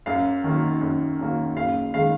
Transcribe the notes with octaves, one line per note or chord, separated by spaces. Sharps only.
F#2 F5
D#3 F#3 A#3
F#2
D#3 F#3 A#3
F#1 F5
D#3 G#3 F5